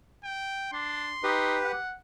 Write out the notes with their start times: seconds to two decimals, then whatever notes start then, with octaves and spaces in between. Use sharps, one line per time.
0.24 G5
0.73 D4 C6
1.24 D#4 G4 B4
1.63 F#5